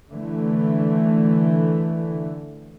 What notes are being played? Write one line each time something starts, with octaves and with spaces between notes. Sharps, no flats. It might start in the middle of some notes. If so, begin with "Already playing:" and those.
D3 E3 A3